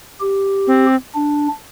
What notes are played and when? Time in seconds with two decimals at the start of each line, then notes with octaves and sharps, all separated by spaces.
0.20 G4
0.67 C4
1.15 D4